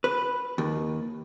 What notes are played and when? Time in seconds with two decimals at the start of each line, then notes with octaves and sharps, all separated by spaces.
0.04 B4
0.58 D#2